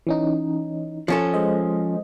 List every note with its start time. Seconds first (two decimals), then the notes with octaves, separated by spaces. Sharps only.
0.07 E3 C#4 D#4
1.08 F3 C#4 A4
1.34 G#3 C5 D#5